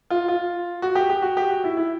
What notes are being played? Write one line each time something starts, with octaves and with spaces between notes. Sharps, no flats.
F4
F4
F#4
G4
G4
F#4
G4
F#4
E4
E4